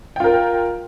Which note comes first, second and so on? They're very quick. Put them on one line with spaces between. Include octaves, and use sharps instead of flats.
G5 F4 A#4